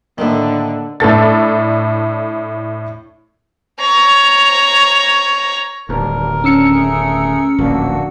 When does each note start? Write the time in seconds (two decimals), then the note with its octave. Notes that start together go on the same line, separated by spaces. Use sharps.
0.18 A2 D3 D#3 A#3 D4
1.00 A2 D4 A4 A6
3.80 C#5 A#5
5.89 D1 D#2 G3 D4 A#4
6.44 C#4 D4 E6 C#7
6.70 A3 G#4
7.58 D1 A#1 G#2 A#3 D4 F#4